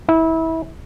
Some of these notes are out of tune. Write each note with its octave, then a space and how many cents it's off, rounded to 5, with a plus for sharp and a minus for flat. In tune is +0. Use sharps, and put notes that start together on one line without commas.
E4 -25